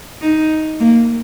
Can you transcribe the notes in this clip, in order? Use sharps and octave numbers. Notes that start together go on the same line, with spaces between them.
D#4
A#3